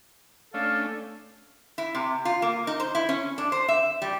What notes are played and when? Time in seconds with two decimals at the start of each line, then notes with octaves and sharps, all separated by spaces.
0.54 A3 C#4 D4 A4 F5
1.78 E4
1.95 C3
2.25 F4
2.42 A#3
2.67 D#4
2.80 C5
2.95 E4
3.09 C#4
3.38 D4
3.52 C5
3.68 E5
4.02 G3